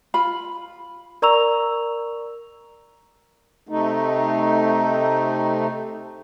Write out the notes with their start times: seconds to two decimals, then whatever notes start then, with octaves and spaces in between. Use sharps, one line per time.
0.14 F4 B5
1.22 A#4 D5 A#5 C#6 E6 F7
3.69 C3 A3 D#4